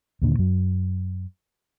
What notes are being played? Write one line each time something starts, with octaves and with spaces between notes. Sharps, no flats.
D#2 A#2 D3
F#2 F#3